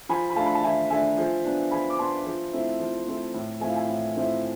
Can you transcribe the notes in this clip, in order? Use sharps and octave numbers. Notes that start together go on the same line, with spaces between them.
F3 G#5 B5
B5
A3 D4 F5 A5
B5
A5
F3 E5 G#5
A3 D4 E5 G#5
F3
B3 D4
F3 G#5 B5
D6
B3 D4 A5 C6
F3
A3 C4 E4
F3
A3 C4 E4
A2
F3 A3 C4 E4 G#5
F5
E5 G#5
A2
F3 A3 C4 E4